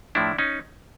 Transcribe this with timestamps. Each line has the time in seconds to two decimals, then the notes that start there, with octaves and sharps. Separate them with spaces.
0.15 A2 F3 A3 D4 E4
0.38 C#4 D#4